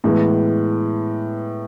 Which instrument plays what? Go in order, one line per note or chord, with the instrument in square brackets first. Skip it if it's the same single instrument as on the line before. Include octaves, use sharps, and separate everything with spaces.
[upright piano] A2 E3 G#3 B3